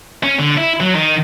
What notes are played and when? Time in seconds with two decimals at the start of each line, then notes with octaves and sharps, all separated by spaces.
0.23 C#4
0.39 D3
0.58 E4
0.81 F#3
0.95 D#3